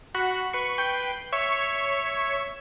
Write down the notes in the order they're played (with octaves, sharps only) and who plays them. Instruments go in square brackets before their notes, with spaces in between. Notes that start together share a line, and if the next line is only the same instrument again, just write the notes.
[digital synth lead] F#4 [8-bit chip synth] B5
[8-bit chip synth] B4 C7 [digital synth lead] C#6
[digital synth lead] G5
[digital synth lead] C#5 [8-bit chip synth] E5